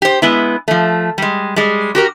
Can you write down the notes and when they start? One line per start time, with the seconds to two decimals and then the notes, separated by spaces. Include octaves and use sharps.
0.02 G4 C5
0.22 G#3 B3 E4
0.68 F3 A3
1.18 G3 G#3
1.56 G3 G#3
1.95 F#4 G4 A#4